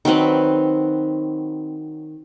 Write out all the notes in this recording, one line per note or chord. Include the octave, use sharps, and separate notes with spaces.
D#3 F#3 C4 B4